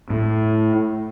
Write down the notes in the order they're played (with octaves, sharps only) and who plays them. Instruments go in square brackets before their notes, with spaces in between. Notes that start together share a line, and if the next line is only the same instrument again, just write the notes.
[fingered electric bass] A2